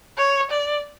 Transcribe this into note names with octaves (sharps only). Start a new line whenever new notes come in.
C#5
D5